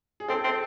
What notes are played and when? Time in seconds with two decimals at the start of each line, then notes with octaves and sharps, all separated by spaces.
0.20 G#4
0.28 C4 A4
0.45 C4